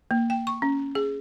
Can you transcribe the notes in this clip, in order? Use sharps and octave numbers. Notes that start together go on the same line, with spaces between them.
A#3
G5
C#6
C#4
G#4